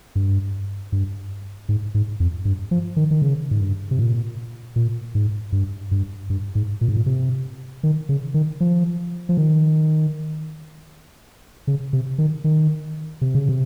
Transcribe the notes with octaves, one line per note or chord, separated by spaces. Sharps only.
G2
G2
G#2
G#2
F2
G2
F3
D#3
D#3
C#3
G#2
G2
C3
A#2
A#2
G#2
G2
G2
G2
G#2
A#2
G#2
A#2
C3
D#3
C#3
D#3
F3
F3
D#3
C#3
C3
D#3
D#3
C3
C#3
C3